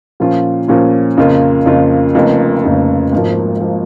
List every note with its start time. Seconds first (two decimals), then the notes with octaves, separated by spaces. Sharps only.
0.20 A#2 F3 C#4 F4
0.68 A#2 F3 C#4 F4
1.17 F2 C#3 A#3 F4
1.66 F2 C#3 A#3 F4
2.15 F1 F2 C#3 A#3
2.64 F1 F2 C#3 A#3
3.12 G#1 G#2 F3 A#3
3.61 F3 A#3